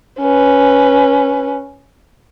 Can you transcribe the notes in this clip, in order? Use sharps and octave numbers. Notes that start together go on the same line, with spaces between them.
C#4 B4